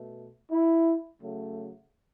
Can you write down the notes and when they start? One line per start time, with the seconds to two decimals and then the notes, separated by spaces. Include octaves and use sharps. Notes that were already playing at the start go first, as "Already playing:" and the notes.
Already playing: B2 A3
0.52 E4
1.22 C#3 F#3 A3